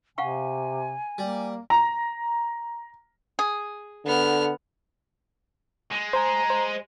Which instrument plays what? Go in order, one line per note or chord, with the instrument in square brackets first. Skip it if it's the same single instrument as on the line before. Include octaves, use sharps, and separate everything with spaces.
[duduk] C3 [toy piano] F5 F#5 C#6 [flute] G#5
[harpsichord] G3 [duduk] A#3
[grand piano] A#5
[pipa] G#4
[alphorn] D3 [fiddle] B3 F6
[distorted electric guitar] G#3
[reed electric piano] C5 G#5 [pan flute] A#5
[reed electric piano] C5